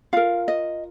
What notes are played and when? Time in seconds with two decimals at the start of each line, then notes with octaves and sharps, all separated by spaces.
0.13 F4 A#4 F5
0.48 D#5